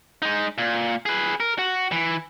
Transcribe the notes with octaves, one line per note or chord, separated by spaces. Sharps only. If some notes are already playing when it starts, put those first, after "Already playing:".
G#3 D#4
A#2
G#4 B4
A#4
F#4
E3